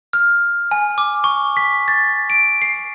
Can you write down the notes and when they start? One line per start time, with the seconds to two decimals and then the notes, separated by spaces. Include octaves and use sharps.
0.13 F6
0.71 G#5
0.98 D6
1.24 C#6
1.57 B6
1.88 A6
2.30 D7
2.62 C7